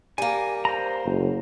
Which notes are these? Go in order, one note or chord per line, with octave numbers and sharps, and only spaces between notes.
G3 A#3 G#5
C5 A#5
F#1